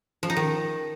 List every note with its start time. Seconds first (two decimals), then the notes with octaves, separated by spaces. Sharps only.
0.23 F3
0.30 D#4
0.37 D#3